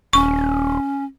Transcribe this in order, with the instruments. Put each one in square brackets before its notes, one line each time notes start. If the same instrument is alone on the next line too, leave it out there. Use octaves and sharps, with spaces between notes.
[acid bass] D#1 [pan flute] C#4 [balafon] C#6